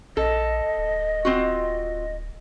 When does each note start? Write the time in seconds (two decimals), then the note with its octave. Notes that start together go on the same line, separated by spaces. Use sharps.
0.17 A#1 A4 D#5
0.78 D1
1.25 C4 F4 F#4